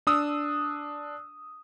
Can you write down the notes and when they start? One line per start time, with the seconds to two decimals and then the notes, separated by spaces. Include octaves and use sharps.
0.07 D4 D#6 E6